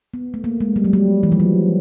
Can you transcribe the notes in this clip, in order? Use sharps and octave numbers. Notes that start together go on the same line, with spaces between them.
B3
A3
A#3
G#3
G3
F#3
G3
E3
F3
F#3